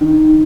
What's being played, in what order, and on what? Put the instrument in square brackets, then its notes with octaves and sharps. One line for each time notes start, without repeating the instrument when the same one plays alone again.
[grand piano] D#3